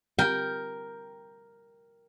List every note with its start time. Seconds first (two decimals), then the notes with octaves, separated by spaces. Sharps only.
0.19 A#4 G5